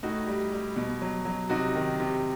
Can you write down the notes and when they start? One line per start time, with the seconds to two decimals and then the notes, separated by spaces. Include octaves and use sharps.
0.03 A2 D#4 F#4
0.27 G3
0.52 G3
0.76 B2
1.02 F#3
1.25 F#3
1.50 C3 D#4 F#4
1.75 D#3
2.00 C3